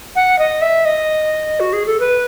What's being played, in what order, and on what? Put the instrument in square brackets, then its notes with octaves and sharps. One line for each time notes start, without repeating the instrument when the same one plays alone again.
[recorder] F#5
D#5
E5
D#5
F#4
G#4
A4
B4